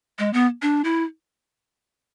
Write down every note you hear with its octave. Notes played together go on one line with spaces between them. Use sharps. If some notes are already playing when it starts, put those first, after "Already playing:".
G#3
B3
D4
E4